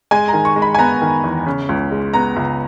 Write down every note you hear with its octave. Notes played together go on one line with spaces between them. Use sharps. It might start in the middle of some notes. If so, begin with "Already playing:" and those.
G#3 G#5
A#5
D#3
C#6
G#3
B5
G#5
B3 A#5
D#3
E2
C#3
C#2
G#3
B3 A#5
C#2